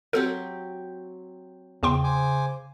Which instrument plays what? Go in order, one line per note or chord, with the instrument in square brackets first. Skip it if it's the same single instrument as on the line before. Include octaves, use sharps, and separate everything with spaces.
[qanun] F#3 C4 G4 [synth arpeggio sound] A4
[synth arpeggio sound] E2 G5 C6 [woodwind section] C#3
[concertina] C5 G#5 D6